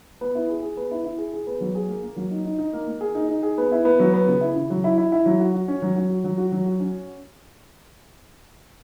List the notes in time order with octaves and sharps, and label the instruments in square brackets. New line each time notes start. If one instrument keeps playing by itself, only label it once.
[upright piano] B3
E4
G#4
G#4
B3
E4
E4
G#4
G#4
B3
F#3
G#4
A#3
A#3
F#3
D#4
D#4
D#4
A#3
A#3
G#4
D#4
D#4
G#4
B3
E4
B3
F#3
B3
C#3
E4
C#3
F#3
E4
E4
E4
F#3
F#4
F#4
C#4
F#3
F#3
F#4
F#3
F#4
F#3
F#4
C#4